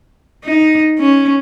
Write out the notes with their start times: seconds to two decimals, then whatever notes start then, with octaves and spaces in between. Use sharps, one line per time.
0.45 D#4
0.99 C#4